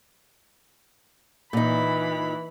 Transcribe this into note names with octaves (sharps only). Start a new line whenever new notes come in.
A#2 E3 D#4 B5